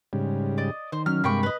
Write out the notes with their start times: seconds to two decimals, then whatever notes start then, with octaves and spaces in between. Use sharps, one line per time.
0.13 G#2 C#3 G3
0.58 D5 D#5
0.92 D#3 C5
1.06 F#3 C#4 F6
1.24 G2 C3 G#3 A#3 G5 B5 C#6
1.43 B4 D#5